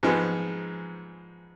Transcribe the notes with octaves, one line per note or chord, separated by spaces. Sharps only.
G#2 F3 G#3 B3